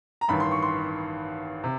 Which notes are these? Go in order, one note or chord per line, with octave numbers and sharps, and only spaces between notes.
A#5
A1 G2 D#3 B5
C6
C#6
C6
C3